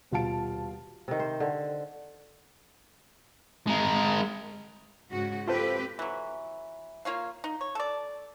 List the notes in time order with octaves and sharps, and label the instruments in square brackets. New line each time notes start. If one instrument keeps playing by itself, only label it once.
[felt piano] D#1 B2 F4 F5 A5 D7
[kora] C3 D#3
C5
D3
[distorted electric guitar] G#3 A#4
[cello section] G#2 C#3 F#4
[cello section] C4 G4 B4 [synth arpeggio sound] F4 A4 C5
[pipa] E3 F#3
A#3 F4 C#5 F5
D#4
C#5
A4 D5